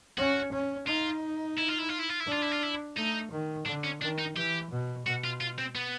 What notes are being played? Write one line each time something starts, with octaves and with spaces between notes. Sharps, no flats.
C#4 F#4
C#4
D#4 F4
E4
F4
E4
F4
E4
F4
E4
D4 F4
E4
F4
E4
A3 D#4
D#3
D3 D4
C#4
D#3 D4
D#4
E3 G4
B2
B2 F#4
F4
F4
C4
B3